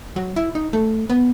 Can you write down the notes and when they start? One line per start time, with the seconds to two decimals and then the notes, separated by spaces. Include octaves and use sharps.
0.16 F#3
0.36 E4
0.55 D#4
0.73 A3
1.10 B3